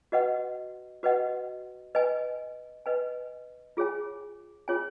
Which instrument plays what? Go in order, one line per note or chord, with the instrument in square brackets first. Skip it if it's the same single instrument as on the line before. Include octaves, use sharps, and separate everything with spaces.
[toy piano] F#4 B4 D#5 F#5
F#4 B4 D#5 F#5
B4 D#5 G#5
B4 D#5 G#5
F4 G#4 C#5 G#5
F4 G#4 C#5 G#5